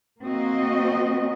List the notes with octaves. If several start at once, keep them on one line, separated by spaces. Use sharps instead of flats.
A#3 C4 F#4 D#5